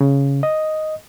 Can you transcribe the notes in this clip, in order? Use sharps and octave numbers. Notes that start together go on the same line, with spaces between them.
C#3
D#5